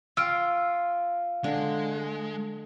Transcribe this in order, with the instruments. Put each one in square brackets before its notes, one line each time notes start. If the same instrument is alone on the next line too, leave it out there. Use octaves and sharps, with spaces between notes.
[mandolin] F4 [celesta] E6 F6 D7
[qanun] D3 D4 [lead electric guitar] G#3